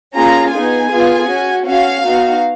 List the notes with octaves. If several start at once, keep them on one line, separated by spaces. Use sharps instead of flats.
A#3 C#4 F4 G#4 A#5
B3 D#4 G#4 G#5
B3 F4 G#4
C#4 F#4
C#4 F#4 F5
B3 D#4 F#4